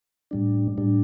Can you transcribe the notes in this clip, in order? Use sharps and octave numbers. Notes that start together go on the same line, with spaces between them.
A2 G3 D4
A2 G3 D4